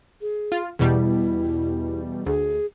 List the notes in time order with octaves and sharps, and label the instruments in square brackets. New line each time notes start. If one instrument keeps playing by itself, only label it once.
[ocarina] G#4
[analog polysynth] F4
[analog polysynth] E2 B2 G3 [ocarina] E4
[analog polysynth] D2 [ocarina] G#4